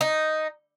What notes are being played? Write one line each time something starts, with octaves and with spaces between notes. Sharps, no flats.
D#4